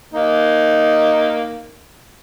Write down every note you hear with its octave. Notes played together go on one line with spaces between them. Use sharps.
A#3 D#4